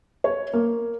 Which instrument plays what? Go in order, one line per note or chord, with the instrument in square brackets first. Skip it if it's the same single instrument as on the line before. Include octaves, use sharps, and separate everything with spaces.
[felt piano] C#5
A#3